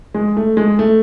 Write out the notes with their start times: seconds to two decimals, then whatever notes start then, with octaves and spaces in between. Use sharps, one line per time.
0.14 G#3
0.37 A3
0.57 G#3
0.79 A3